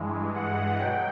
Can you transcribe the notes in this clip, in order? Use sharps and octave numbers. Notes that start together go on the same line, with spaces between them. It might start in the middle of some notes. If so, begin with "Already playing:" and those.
Already playing: G2 E3 G#3
F#5
B2 F#3 G5